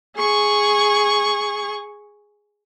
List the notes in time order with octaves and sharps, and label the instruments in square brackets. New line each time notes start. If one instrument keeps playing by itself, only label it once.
[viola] G#4 C#6